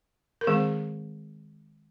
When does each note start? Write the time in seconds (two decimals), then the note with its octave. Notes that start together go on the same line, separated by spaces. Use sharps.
0.41 A#4
0.47 D#3 G#3 C4 G#4